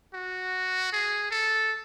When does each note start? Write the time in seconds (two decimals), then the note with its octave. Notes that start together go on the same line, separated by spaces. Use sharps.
0.14 F#4
0.93 G#4
1.31 A4